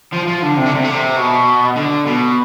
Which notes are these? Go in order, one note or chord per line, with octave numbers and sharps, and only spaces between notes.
F3
F3
D3
C3
D3
C3
D3
C3
B2
D3
B2